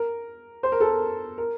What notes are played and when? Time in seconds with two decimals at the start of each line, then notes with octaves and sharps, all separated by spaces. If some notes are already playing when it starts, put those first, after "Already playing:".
Already playing: A#4
0.63 C5
0.72 A#4
0.80 A4
0.89 A#4
1.38 A#4